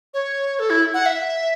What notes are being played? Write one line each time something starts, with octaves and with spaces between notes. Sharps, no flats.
C#5
A4
E4
F#5
E5